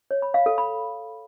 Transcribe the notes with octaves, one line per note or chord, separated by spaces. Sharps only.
C#5
B5
F5
A4
B5